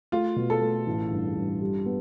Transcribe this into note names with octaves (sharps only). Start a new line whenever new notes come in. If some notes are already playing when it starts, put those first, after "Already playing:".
A3 F4
B2
A4
A3
A1
G2
G2
G3
B3